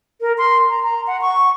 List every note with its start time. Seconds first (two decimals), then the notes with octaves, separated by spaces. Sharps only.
0.21 A#4
0.38 C6
0.69 A#5
0.83 A#5
1.07 F#5
1.21 C#6